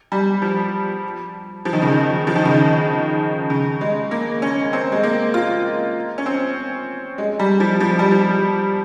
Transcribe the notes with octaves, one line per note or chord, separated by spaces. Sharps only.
G3
F3
F3
D#3
C#3
D#3
F3
D#3
C#3
D#3
C#3
G#3
A#3
C#4
C4
G#3
A#3
F4
C#4
C4
G#3
G3
F3
F3
G3
F3